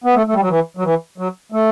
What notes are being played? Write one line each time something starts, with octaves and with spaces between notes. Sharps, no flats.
B3
A3
A3
G3
F#3
E3
F#3
E3
F#3
A3